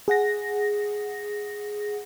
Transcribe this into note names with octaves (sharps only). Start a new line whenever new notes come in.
G#4 F#5 A#6